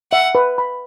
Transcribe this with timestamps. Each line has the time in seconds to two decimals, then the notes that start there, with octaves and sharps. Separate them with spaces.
0.12 E5 F#5
0.35 B4
0.58 B5